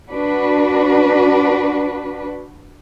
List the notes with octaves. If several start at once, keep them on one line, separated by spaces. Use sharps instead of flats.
D4 F#4 B4